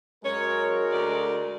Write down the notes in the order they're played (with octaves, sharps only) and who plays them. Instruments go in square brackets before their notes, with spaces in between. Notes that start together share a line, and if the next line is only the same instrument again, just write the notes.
[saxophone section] F#2 C#5 [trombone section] G#3 F#4 A#4
[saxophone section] D2 D3 D5